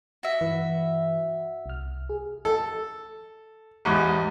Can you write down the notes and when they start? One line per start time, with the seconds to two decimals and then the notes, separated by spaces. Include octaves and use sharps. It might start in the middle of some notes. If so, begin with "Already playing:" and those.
0.23 F#4 E5
0.41 G2 E3 B4
1.66 C2 F6
2.09 G#4
2.45 A4
3.85 A1 E2 G#2